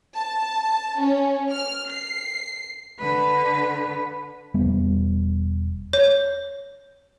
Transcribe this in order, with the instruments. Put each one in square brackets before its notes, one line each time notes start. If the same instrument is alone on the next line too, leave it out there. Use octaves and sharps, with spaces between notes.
[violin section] A5
C#4
F6
C7
[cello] D3 B4
[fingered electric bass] E1 G3 B3
[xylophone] C#5